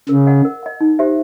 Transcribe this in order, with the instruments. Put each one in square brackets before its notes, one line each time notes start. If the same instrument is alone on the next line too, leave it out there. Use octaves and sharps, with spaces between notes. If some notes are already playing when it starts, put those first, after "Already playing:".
[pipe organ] C#3 [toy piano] A#4
[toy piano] D#5 F#5
A#4
D#5 F#5
D#4
G4 C5 E5